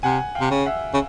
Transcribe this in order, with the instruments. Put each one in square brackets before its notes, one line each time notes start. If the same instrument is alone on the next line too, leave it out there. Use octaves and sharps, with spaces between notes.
[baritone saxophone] C3 [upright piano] F#5 G#5
[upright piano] F5 G5
[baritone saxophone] C3
C#3
[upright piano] E5 F#5
[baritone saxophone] C#3